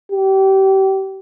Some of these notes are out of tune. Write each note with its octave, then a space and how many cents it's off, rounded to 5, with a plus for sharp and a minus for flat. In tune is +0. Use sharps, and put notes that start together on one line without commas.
G4 -30